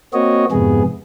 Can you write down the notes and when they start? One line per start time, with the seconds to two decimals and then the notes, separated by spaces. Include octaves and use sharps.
0.14 A#3 C4 F#4 C#5 D#5
0.52 F2 G#2 C3 B3 G#4